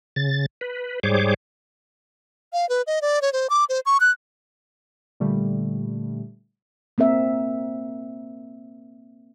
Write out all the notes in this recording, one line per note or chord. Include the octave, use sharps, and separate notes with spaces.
C#3 A6
B4
G#2 G3 G#4 C5 C#5 D6
F5
B4
D#5
D5
C#5
C5
D6
C5
C#6
F#6
A#2 D3 G3 A3
A#3 C4 A#4 E5